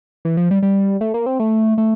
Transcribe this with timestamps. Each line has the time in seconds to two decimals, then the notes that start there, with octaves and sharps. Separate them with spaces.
0.25 E3
0.37 F3
0.51 G3
0.63 G3
1.01 A3
1.14 A#3
1.26 C4
1.40 A3
1.78 A3